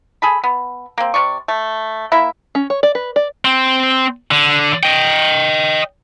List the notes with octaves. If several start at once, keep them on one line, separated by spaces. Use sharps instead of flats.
G#4 A4 B5
B3
A#3 C4
C3 D5 C#6
A3
A#3 E4 E5
C#4
C#5
D5
B4
D5
C4
D3
D#5 G5